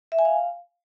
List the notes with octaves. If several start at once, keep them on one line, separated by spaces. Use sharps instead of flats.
E5
G#5
F5